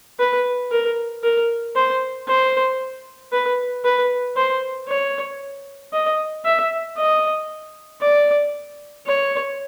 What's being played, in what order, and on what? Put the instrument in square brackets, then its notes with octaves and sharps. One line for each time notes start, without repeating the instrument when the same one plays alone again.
[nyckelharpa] B4
A#4
A#4
C5
C5
B4
B4
C5
C#5
D#5
E5
D#5
D5
C#5